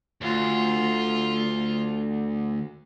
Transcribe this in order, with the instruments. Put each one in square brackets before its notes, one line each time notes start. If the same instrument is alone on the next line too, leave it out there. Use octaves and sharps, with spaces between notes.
[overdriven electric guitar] D2 [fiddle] F4